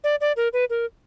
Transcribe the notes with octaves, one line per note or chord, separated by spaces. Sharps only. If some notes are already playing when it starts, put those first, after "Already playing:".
D5
D5
A#4
B4
A#4